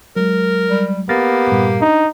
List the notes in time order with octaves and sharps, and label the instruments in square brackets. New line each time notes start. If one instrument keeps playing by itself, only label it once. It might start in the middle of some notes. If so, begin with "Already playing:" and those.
[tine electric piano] F#3 G#3 [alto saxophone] A#4
[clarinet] G3
[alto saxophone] A#3 [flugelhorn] B3 [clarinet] G4 [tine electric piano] F6 A6 A#6
[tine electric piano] G2 A#2 G3
[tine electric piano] D4 [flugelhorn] D#4